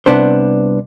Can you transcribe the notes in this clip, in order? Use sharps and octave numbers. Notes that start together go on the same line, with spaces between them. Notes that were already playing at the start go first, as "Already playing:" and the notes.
C2 F#2 C3 B3 D4 C5